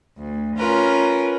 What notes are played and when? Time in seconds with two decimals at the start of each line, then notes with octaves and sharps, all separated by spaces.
0.18 D2
0.57 C#4 F4 A#4 B4